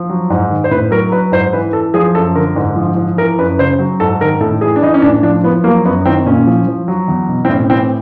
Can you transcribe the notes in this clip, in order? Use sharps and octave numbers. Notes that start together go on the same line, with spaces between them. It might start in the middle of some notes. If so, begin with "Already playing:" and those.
Already playing: F3
F#3
G#2
D#3
C5
A2 B4
F#3 A#4
F#3 B4
G#2 C5
E3 B4
E3 A4
F3 G#4
F#2 A4
D3 A#4
G#2
F3
F3
E3 A#4
F#2 B4
C#3 C5
F#3
G#2 A4
D#3 A#4
A2 A4
E3 G#4
D4
E3 D#4
C#4
A2 D4
F3 D4
F3 B3
F#3 A#3
F#2 B3
D#3 C4
A#2 C#4
F3
F3
F#3
E2
B2
C4
A2 C#4
E3 C4